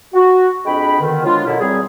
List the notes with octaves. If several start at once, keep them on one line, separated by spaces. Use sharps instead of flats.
F#4
F2 G#3 D4 G#4 G5 B5
B2 D3 D#3
F3 F#3 G#3 D4 F4
F#2 B2 D3 E4
E2 F#3 G3 C4 G#4